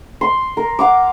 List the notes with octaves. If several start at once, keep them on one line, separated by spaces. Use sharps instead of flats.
C6
A#4
F5 F#5 D6